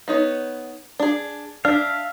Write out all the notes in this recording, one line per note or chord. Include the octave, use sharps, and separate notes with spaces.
B3 D#4 C#5
D4 G#4
D4 E5 F5